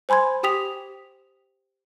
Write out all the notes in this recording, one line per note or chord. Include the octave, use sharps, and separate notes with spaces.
C5 G#5 B5 C6 G#6
G4 G5 D#6 B6 F7